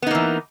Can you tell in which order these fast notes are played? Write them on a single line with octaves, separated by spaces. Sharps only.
B3 D#4 A#3 E3